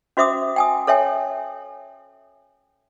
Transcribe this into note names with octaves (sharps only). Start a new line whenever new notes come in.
C#4 F#4 C5 E5 D6 D#6
G5 G#5 D#6
A4 C#5 E5 G5 G#5